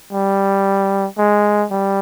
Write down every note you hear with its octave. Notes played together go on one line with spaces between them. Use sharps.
G3
G#3
G3